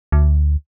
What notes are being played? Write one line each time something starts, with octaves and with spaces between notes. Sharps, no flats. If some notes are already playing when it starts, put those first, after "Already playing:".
D2